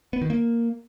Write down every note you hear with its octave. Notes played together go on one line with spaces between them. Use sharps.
B3
D#3
A#3